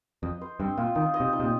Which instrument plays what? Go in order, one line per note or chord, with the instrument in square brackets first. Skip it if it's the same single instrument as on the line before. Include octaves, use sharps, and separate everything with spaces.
[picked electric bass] F2 [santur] D#5
[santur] C5
[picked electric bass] G2 [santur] C4
[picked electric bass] A#2 [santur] F4
[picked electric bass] D#3 [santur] D#4
[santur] D#5
[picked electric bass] C3
[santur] D#4
[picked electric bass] C3
A#2